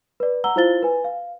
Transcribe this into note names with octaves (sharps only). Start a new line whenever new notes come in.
B4 D5
F#5 A#5 E6 G7
E4 F4 C5 F5 A6 G7
B4 G#5
F5